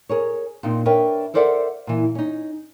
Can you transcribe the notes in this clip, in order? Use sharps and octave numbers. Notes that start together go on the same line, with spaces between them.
G#4 A#4 C#5
A#2 C4 D#4
D4 A#4 B4 C#5 E5 G5
A4 A#4 C5 D5 E5 F#5
A#2 E3
C#4 D#4